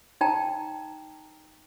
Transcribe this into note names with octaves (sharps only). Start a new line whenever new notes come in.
D#4 G5 A5 A#5